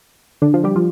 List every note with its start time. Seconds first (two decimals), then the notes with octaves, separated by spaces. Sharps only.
0.42 D3 D4
0.54 F3 F4
0.64 G3 G4
0.76 F3 F4